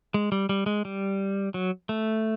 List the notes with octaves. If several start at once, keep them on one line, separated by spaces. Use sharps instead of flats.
G#3
G3
G3
G#3
G3
F#3
A3